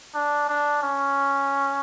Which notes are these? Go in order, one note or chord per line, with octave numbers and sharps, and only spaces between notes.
D4
D4
C#4